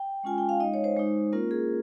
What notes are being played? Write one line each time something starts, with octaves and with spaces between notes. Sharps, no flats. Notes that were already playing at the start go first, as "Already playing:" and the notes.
Already playing: G5
G#3 C#4 F4 G#5
G5
F5
G#3 D#4 D#5
C#5
C5
G#3 D#4
A#3 C#4 F4 A#4
G#4